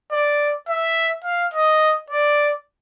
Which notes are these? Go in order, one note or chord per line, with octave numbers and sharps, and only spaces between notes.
D5
E5
F5
D#5
D5